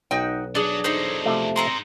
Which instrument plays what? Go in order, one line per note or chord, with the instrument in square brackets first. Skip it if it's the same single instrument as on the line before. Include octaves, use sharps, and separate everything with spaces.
[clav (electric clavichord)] B1 [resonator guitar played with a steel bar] D#4 F#4 G5
[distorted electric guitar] F#3 [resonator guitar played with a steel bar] D4 G#4
[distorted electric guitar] E2 F#3 [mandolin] D#4 A4 C5
[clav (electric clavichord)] C3 F3 A3
[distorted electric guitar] G#3 D#4 [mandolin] C4 A#5 C6